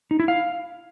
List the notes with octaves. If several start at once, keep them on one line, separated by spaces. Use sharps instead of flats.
D#4
E4
F5